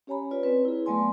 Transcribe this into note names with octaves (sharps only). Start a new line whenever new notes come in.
C#4 G4 C#5 G#5 A#5 B5
F4 B4 C#5 D5
C4 B4
E4 G#4
F#3 A3 B3 D5 G#5 C6